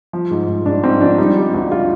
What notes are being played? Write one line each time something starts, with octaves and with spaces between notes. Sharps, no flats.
F3
G#2
G#2
G#2 D4
G#2 C4
F3 D4
G3 D#4
G3
D2
G3 F4